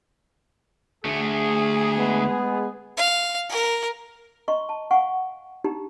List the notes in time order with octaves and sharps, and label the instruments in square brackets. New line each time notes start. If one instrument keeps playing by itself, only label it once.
[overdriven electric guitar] D2 A3 [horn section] G#4
[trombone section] G#3 B3
[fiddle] F5
A#4
[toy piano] D#5 A#5 C6 C#6
A5
F5 F#5 G#5 C#6
D4 D#4 G4 A#5